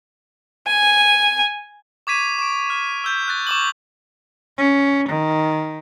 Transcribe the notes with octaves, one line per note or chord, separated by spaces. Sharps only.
G#5
C#6 D6 G#6 B6 D#7
C#6 D6 D7
F6
E6 G6 B6
F#6 A6
C#6 D6 F#7
C#4
D#3